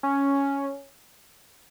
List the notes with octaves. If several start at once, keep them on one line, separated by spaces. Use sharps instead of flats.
C#4